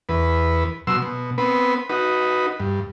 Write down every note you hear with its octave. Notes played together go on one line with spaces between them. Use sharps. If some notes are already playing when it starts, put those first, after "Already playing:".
E2 B4
B2 F#3 C6 E6
B2
B3 C4 B4
D#4 F#4 B4
G2